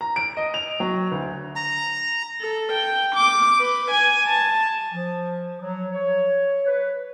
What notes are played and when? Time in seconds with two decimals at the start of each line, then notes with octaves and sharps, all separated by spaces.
0.01 A#5
0.16 D7
0.37 D#5
0.54 F7
0.80 F#3
1.12 D2
1.56 A#5
2.41 A4
2.72 G5
3.15 D6
3.59 B4
3.91 G#5
4.27 A5
4.93 F3
5.61 F#3
5.92 C#5
6.66 B4